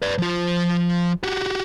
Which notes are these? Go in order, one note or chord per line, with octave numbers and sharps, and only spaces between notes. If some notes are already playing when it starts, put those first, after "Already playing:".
B4 D5
F3 F4
F#4 G4